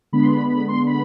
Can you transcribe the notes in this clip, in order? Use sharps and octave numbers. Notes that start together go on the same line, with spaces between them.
D3 G#3 B3 D4 B5
C6
B5
B5
C6
B5